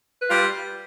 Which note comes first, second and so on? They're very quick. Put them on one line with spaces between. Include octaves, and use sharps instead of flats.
B4 F4 G3